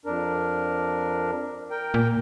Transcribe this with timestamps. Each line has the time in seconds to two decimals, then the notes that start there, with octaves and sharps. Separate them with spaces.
0.06 F2 D4 A#4
1.71 A#4 G5
1.94 A#2